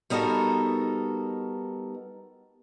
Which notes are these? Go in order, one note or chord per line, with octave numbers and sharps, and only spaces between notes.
G3 B3 D#4 F#4 A4 A#4